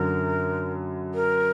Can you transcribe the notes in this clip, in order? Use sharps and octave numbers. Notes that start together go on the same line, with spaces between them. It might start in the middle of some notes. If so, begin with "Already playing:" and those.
Already playing: F#2 D3 F#3 A#4
A#4